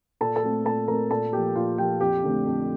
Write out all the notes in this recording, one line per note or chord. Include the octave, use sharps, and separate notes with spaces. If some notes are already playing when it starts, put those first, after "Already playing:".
A#2 A4 A5
A4 A5
A3 C4
A#2 A4 A5
A3 C4 A#4 A#5
A#2 A4 A5
F3 A#3 G4 G5
A#2 F4 F5
F3 A#3 G4 G5
F2 G4 G5
D3 A3 C4
F2